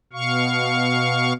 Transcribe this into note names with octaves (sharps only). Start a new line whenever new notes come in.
B2 F5 C#6